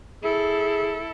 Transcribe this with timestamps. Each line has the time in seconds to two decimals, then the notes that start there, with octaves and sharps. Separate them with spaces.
0.23 E4 G#4 A4